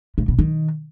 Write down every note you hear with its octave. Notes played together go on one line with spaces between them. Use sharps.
A2
B2
D#3